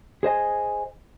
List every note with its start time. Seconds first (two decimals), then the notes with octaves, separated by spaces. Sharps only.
0.23 G#4 C5 D#5 G#5